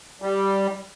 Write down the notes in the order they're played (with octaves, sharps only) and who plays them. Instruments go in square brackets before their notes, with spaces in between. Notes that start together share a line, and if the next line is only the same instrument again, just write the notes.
[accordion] G3